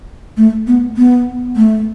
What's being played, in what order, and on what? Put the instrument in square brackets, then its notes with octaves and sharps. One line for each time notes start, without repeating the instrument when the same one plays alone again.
[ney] A3
B3
B3
A3